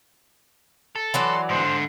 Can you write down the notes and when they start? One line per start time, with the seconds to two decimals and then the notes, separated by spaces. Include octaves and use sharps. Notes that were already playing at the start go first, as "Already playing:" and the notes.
0.96 A4
1.14 E3 F#3 D5 C6
1.49 G#2 D3 C5